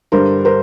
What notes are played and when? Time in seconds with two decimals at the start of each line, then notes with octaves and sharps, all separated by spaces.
0.12 G2 D3 G3 A#4 C5
0.45 A#4 C5